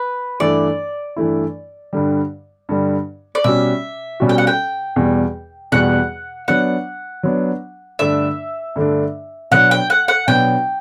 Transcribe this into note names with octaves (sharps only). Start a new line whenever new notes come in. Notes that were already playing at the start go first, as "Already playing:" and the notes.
Already playing: B4
G2 E3 A3 E4 D5
G2 E3 A3 E4
G2 D3 G3
G2 D3 G3
D5
B2 G3 C#4 F#4 E5
B2 G3 C#4 F#4
G5
F#5
G5
E2 B2 G3
E2 B2 G3 F#5
F#3 B3 D4 F#5
F#3 B3 D4
G2 D3 A3 D4 E5
G2 D3 A3 D4
B2 F#3 B3 D4 F#5
G5
F#5
F#5
B2 F#3 B3 D4 G5